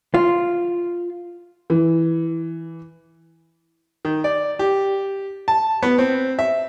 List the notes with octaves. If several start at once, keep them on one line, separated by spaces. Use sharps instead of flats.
F4
E3
D#3
D5
G4
A5
B3
C4
E5